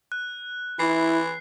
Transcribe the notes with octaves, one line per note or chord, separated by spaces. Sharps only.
F#6
E3 E4 C7